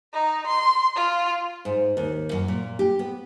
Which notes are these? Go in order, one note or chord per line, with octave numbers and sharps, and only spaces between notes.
D#4
C6
F4
G#2
D#2
F#2
A#2
G4
B3